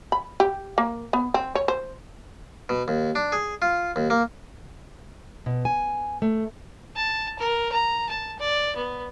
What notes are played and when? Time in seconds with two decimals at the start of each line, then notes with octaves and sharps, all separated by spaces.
0.12 B5
0.40 G4
0.78 A#3
1.13 B3
1.34 C4
1.55 C#5
1.68 C5
2.69 B2
2.88 D#2
3.15 D4
3.32 G#4
3.62 F4
3.96 D#2
4.10 A#3
5.46 B2
5.65 G#5
6.22 A3
6.96 A5
7.39 A#4
7.73 A#5
8.09 A5
8.39 D5
8.77 B3